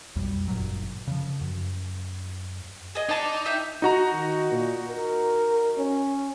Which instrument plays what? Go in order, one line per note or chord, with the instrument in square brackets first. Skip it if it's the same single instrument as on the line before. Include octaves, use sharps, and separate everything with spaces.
[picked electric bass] B1 F2 G3
G1 F#2 A#2 F#3
C#3 F3
F#2
[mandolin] G#4 D#5
[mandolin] D4 A5 D6 [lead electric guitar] D#4
[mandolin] E5 G5
[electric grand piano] D#4 F#4 A#5
[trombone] D#3
A#2
A#4
C#4